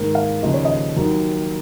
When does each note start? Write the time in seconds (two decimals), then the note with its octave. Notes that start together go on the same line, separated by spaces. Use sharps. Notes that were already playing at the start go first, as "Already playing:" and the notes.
Already playing: G#2 D#3 A#3
0.15 F5
0.42 D#2 C#3 F3 D#5
0.54 C#5
0.65 D#5
0.96 D#2 D#3 F#3